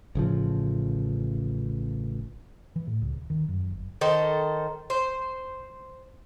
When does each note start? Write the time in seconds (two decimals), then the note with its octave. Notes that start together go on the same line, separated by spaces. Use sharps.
0.15 A1 C#3 F3
2.76 E3
2.87 A2
3.02 C#2
3.16 D#1
3.30 D#3
3.48 F#2
3.70 G1
4.01 D#3 A4 C5
4.90 C5